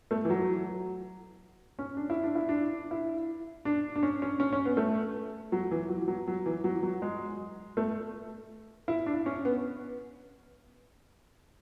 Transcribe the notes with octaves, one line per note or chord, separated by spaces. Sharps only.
A3
E3
F#3
C#4
D4
E4
D4
E4
D4
E4
D4
D4
C#4
C#4
C#4
C#4
B3
A3
F#3
E3
F#3
F#3
F#3
E3
F#3
F#3
G#3
A3
E4
D4
C#4
B3